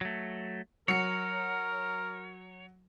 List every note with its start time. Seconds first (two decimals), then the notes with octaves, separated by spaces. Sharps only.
0.01 F#3 A3
0.88 F#3 A#4 C#5 C#7